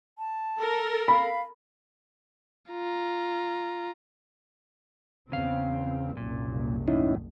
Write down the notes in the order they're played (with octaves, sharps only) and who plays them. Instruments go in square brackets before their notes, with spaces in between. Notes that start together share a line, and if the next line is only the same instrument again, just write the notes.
[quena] A5
[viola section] A4 A#4
[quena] F5 [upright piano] B5
[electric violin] F4 A#5
[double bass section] E2 C4 [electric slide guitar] C#3 F5
[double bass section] F#1 C2 [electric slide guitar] A#2
[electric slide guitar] E2 A2 [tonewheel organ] C#4 D#4 E4